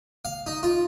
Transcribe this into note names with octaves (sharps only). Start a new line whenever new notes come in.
F5
D#4
F4